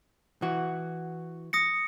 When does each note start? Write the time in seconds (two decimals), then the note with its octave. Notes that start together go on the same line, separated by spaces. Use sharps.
0.42 E3 F#4
1.53 D#6 A#6 C#7